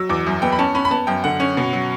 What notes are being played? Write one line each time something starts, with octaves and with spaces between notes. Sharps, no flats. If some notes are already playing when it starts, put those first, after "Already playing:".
Already playing: F#3 E6
E2 D6
F#2
B3 G5
B5
C#4 A5
C#4 B5
B5
B3 A5
F#2 G5
D3 F#5
C#4
B2
F#3